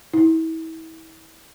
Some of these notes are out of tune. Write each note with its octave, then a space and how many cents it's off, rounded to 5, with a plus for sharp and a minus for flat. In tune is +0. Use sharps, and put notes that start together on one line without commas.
E4 -35